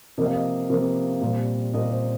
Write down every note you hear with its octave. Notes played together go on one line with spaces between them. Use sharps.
C3 F3 A#3 D#5
F5
D#5
C3 F3 A#3
A#2 G3 C4
A#2 G3 C4 D#5
C5